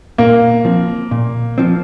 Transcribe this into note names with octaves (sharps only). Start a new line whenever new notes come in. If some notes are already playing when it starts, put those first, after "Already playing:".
A#2 A#3
F3 C4
A#2
F3 C4